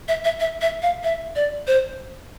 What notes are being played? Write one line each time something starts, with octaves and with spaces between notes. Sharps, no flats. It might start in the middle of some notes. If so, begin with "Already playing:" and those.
E5
E5
E5
E5
F5
E5
D5
C5